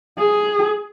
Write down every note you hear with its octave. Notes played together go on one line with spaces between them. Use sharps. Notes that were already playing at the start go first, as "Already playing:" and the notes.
G#4